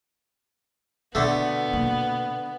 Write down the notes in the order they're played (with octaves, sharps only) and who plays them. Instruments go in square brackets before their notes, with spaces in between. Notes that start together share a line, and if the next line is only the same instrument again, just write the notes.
[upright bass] B2 [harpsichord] D3 A3 [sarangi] B3
[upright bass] B2 A#3